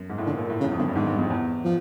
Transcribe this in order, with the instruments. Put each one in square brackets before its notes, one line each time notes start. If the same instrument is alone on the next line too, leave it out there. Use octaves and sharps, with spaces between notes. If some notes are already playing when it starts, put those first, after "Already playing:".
Already playing: [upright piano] F#2
G#2
A2
[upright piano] A#2 [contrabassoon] D3
[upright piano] A#2
A2
[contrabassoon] C#3
[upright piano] E2
F2
[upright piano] F#2 [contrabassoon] D3
[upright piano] G2
[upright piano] G#2 [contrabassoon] D#3
[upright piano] G2
F2
E2
[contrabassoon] F3